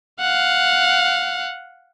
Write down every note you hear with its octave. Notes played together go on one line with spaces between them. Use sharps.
F5 F#5